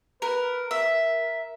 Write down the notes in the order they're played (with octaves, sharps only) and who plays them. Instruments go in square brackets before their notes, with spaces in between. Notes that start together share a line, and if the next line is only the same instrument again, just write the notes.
[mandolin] A#4 [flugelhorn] B4
[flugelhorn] A#4 [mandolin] E5